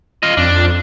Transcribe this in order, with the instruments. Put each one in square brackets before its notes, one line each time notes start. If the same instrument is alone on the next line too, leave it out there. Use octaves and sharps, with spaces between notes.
[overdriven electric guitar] F4 D#5
[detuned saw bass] F2 [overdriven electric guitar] D4